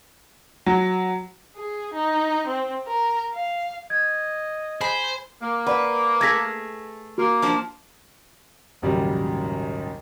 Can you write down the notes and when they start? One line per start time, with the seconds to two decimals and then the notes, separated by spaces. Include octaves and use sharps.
0.66 F#3
1.56 G#4
1.93 D#4
2.47 C4
2.87 A#4
3.34 F5
3.90 D#5 G#6
4.81 G#4 C5 B5
5.42 A#3
5.66 B4 D5 F#5
6.21 A3 G#4 G#6 A#6 B6
7.18 A#3 F#4
7.42 F3 D4 C5
8.82 A#1 D#2 G#2 C#3 F#3 G3